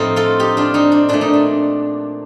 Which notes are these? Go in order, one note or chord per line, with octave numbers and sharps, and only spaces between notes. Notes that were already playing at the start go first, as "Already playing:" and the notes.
Already playing: A2 F3 A3 C4 D#4
F4 A4
D#4 G4
D4 F4
C4 D#4
D4
A#2 A3 D4
D#4
D4